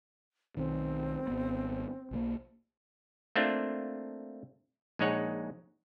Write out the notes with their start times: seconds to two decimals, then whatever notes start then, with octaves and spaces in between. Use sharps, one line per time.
0.57 B1 D#3 C4
1.27 G#1 B3
2.11 B1 F#3 A#3
3.36 A3 A#3 C4 D4 F4
4.99 A#1 G#3 D#4 C#5 F#5